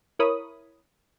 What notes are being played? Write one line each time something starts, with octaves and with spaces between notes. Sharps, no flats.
E4 A#4 C#5 B5 D#6